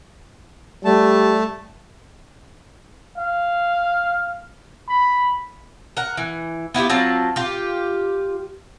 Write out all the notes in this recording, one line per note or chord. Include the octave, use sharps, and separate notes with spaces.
G3 A3 A5
F5
B5
A#4 F#5
E3
B3 E4 F4 G4
F#3 C4 F4 A5
F4 G4